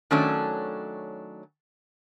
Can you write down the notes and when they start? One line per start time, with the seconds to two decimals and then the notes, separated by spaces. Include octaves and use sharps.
0.11 D#3 F#3 A3 C#4 D4 A4